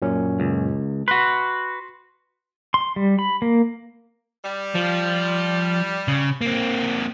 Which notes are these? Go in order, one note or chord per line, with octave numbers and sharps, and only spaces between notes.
F#2 A#2 C#4
C#2
F#4 B4 C6
C6
G3
B5
A#3
G3
F3
C#3
A#3 C4